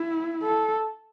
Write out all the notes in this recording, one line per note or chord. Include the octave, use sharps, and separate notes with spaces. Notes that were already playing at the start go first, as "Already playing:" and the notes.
Already playing: E4
A4